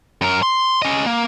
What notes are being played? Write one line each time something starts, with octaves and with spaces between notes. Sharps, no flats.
F#2 A#4
C6
C#4 D#5
A#3